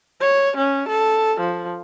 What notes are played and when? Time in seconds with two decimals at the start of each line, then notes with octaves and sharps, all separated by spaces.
0.21 C#5
0.57 C#4
0.89 A4
1.41 F3